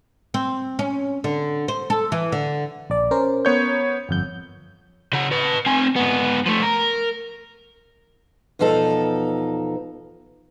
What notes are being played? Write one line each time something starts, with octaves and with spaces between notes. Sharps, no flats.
C4
C#4
D3
C5
A4
E3
D3
A#1 D5
C#4 A#4 C5
B3 C#5 G6
G1 F2 G6
C#3 F#5
B4 A5
C4 G#5
G#2 B3
F3 A3
A#4
E2 B2 F3 D#4 A4